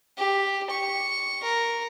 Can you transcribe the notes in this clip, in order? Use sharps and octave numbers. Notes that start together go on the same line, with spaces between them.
G4
C#6
A#4